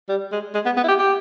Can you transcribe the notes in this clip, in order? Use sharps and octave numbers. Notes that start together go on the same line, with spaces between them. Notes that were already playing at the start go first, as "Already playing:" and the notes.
G3
G#3
G#3
B3
B3
E4
G4
G4